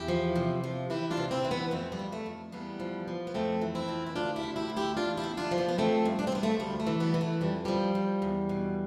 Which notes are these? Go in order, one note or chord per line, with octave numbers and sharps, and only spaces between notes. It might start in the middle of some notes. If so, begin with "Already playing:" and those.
Already playing: E2 E4 G4
F3
C3
F3
E3 E4 G4
D4 F4
C3
C4 E4
E3
B3 D4
F2 A3 C4
G3 B3
F2
A3
F2
E2 G3 B3
F3
F3
B3
F2 A3 C4
E3
C4 E4
F2
E4
D2 D4 F4
E4 G4
D2
E4 G4
D2
E4 G4
E2 D4 F4
E4 G4
E2
D4 F4
F3
B3 D4
B3
F3 A3 C4
G2
D4
C4
F3 B3
A3 C4
D2 G3
A3
E3
G3 B3
E3
A3
F2 G3
F3 G3
F3
E2
B2